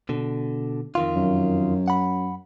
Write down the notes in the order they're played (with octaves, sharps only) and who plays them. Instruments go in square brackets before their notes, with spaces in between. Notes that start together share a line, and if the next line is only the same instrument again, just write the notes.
[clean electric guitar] B2 D3
F2 D#3 F4
[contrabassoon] F#2
[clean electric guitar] F#5 B5